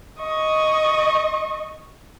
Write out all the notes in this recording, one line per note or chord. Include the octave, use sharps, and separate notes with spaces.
D#5 C#6